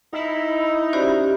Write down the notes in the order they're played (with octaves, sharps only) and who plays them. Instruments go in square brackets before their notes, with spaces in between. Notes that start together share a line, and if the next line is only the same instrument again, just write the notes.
[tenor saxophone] D#4 [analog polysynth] E4
[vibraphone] C#4 G4 [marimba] F#4 C5 D5